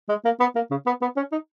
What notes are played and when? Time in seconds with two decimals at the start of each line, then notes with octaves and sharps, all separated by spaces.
0.09 G#3
0.25 A#3
0.40 B3
0.55 A#3
0.71 C#3
0.86 B3
1.02 B3
1.17 C#4
1.32 D#4